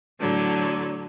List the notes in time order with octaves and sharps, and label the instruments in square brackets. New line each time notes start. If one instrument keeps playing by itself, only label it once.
[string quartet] A2 D3 F#3